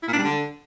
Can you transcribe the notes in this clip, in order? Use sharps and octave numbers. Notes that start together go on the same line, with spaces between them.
E4
A#2
D4
G3
D3